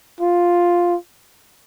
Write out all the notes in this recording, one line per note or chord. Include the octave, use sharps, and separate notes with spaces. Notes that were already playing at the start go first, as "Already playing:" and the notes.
F4